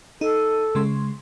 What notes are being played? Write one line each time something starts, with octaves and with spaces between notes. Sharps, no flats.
D#4 A4
C#3 G#3 C6